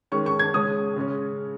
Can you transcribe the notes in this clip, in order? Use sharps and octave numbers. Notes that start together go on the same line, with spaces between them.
D#3 G#3 C#4 C#6
C#6
G#6
C#3 G#3 C#4 D#6
C#3 G#3 C#4